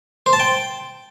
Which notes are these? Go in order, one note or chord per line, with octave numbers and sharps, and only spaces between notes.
C5
A5
G5